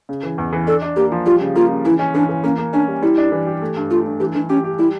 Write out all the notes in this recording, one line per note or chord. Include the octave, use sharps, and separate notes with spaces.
C#3
E3
E2
E3
D4 A4
D4
A#3 G4
F3
G3 F4
C#3
A#3 F4
C#3
E3 E4
C#4
E3 D4
E3
A#3 C#4
A#3
C#4 D4
G3
G3 E4
D4
E3
G4
A3
G2
A3 F4
G2
E3 G4
E3 D4
C#4 G4
G4
G3 E4